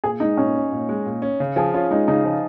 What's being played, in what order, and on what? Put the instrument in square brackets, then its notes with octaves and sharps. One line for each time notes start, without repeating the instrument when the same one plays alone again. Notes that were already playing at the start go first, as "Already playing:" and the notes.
[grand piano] A#2 [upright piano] G#4
[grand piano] G#3 [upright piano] D#4
[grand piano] A#2 [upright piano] C#4
[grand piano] C#4
A#2
G#3
A#2
C#4
C#3
[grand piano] F3 [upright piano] G#4
[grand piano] C#4 [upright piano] F4
[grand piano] G#3 [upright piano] D#4
[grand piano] C#3 [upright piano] D#4
[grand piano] F3